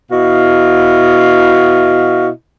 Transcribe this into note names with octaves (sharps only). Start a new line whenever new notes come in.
B2 E4 F#4 D#5 F5